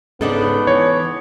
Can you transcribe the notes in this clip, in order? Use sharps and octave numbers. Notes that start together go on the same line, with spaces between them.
G#2 C#3 B3 D4 D#4 A4
E3 C#5